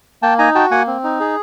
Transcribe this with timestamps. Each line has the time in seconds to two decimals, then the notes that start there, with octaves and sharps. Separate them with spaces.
0.23 A#3 G5 A5
0.39 D#4 G#5 A#5
0.55 F#4 G5 A5
0.71 A#3 F#5 G#5
0.87 C4
1.04 D#4
1.20 G#4